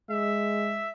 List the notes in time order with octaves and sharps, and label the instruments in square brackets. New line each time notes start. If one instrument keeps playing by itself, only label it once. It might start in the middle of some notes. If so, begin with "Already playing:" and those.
[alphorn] G#3 [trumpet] E5